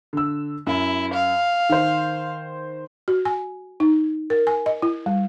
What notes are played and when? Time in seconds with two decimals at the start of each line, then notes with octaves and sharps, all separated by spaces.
0.13 D3 E6
0.67 F#2 E4
1.13 F5
1.69 D#3 C5
3.08 F#4
3.25 G#5
3.80 D#4
4.30 A#4
4.47 G#5
4.66 D#5
4.82 E4
5.06 G3